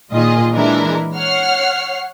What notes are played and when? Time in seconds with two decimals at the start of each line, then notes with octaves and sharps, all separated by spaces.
0.13 A#2 D#3 F4 G#4 D#5
0.53 E3 G#3 D4 E4 A#4
1.15 C#5 F#5 F6 C7